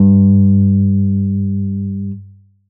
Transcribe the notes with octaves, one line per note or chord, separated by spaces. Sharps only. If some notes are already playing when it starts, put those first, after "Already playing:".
Already playing: G2